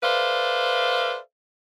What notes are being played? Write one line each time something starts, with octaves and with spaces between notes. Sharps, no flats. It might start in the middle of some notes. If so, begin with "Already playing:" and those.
A4 B4 C5 D5 E5 F5